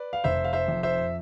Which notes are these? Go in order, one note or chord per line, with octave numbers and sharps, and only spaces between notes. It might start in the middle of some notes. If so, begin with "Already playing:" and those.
Already playing: B4 D5
F5
F1 C5 E5
F5
C5 E5
F2
C5 E5